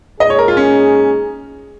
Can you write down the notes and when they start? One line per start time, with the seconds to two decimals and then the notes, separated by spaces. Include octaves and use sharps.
0.20 A#2 G#3 D#4 G#4 D#5
0.30 C#5
0.39 A#4
0.48 F4
0.57 C#4